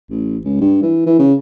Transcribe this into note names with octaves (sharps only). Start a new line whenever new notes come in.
A1
C#2
G2
E3
E3
C#3